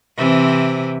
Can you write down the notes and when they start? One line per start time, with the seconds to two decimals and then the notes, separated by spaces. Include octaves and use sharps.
0.17 C3 E3 C4